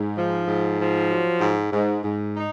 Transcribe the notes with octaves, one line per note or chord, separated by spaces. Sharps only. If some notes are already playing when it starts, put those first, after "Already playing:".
Already playing: G#2
F3
G#2
F3
F#3
G#2
G#2
G#2
D#4